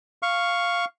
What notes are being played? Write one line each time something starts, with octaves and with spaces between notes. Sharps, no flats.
F5 C#6